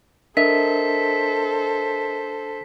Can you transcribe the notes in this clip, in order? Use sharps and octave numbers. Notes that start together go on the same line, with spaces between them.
D4 A4 A#4 C5 D#5 E5 B6